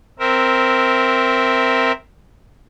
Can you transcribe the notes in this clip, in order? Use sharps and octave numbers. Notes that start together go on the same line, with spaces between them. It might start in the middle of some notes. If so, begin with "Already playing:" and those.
C4 A#4 E5